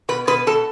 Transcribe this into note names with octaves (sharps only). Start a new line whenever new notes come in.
B2 B4
B2 B4
B2 A4